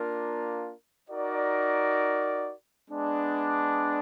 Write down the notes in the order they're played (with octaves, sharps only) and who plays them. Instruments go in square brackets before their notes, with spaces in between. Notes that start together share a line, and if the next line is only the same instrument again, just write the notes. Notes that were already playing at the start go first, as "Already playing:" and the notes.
Already playing: [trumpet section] A#3 D4 F4 A#4
D#4 F#4 A#4 D5
G#3 B3 D4